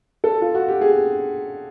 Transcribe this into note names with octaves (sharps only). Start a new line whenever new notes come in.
A4
F4
F#4
G4
G#4